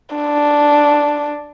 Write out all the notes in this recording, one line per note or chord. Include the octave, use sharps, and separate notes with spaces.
D4